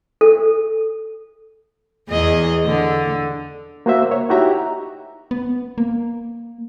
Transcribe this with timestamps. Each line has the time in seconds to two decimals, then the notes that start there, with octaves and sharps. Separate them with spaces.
0.21 A4
2.09 E2 G#4 D#5
2.65 D3
3.86 A#3 F#4 C5 E5
4.11 C#5
4.29 D#4 E4 F#4 G4 E5 A#5
5.31 B3
5.78 A#3